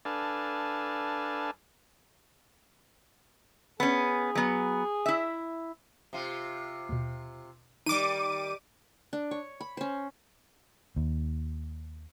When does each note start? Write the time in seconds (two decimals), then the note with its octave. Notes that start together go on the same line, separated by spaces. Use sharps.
0.05 D4 A4 B4 F5 G#5 A5
3.80 B3 C#4 G#4
4.35 F#3 B3
5.06 E4 E5
6.13 C3 F4
6.89 D#2 B2
7.86 D#3 G3 D#4 D6 D#7
9.13 D4
9.31 C#5
9.61 B5
9.77 C#4 C5
10.96 D#2